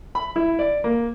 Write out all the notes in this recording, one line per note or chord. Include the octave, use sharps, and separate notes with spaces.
B5
E4
D5
A#3